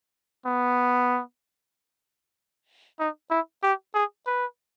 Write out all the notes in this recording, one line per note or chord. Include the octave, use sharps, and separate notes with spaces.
B3
D#4
E4
G4
G#4
B4